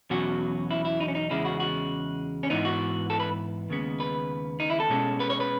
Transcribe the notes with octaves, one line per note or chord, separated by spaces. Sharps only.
E2 B2 F#3 C#4 F#4
E4
E4
D#4
C#4
D#4
E2 C#3 G#3 C#4 E4
F#4
F#4
C#4
G#2 E3 B3 D#4
F#4
A4
B4
D#2 C#3 G#3 B3
B4
D#4
E4
A4
B2 G#3 C#4
B4
C#5
B4